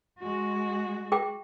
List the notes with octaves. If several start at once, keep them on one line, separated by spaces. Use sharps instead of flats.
G#3 F#4
G#4 G5 D6